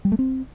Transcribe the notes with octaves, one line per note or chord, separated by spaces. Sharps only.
G3
A3
C4